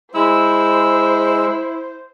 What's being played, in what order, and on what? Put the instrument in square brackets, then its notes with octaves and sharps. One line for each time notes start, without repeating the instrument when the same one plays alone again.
[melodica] G#3 E6 [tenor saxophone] E4 [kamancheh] C5